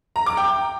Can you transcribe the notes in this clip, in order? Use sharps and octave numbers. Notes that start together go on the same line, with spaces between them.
A#5
D6
G5